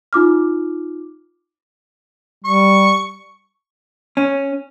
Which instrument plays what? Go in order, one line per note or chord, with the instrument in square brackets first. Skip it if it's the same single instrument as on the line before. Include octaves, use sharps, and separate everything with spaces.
[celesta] D#4 F4 D6 F6
[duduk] G3 [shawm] C#6
[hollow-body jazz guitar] C#4